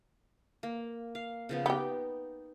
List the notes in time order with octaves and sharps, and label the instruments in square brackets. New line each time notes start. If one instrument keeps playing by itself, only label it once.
[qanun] A#3
F5
C#3 F3 B3
[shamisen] B3 G4 [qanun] D#4 G5